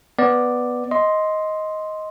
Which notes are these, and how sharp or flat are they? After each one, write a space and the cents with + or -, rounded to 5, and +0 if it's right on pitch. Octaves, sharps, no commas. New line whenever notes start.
B3 +0 D5 +5
D#5 +10 C6 +0